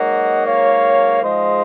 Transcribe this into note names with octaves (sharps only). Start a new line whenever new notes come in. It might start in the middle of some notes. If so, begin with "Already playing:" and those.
Already playing: G#2 F#3 A#3 D#5 F#5
C#5 F5
G#2 F3 G#3 C5 D#5